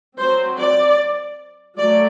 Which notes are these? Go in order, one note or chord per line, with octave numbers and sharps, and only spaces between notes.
F#3 C4 C5
D5
F#3 A3 D5